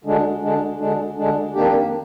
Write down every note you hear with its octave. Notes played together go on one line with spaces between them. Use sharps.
D2 D3 G#3 D4
D2 D3 G#3 D4
D2 D3 G#3 D4
D2 D3 G#3 D4
F2 D#3 A#3 D4 G4